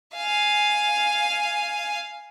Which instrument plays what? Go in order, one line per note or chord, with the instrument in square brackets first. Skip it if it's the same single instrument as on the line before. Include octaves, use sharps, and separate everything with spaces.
[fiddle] F5 G#5